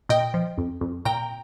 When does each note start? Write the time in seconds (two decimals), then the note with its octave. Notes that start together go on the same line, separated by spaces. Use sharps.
0.09 A#2 D#5 G5
0.34 F3
0.58 F2
0.81 F2
1.05 A#2 G5 A#5